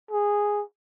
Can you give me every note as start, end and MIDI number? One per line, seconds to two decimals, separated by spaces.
0.11 0.63 68